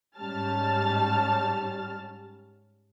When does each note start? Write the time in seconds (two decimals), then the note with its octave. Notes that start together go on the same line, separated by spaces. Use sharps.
0.17 G#2 G3 C#4 A5 F6 A6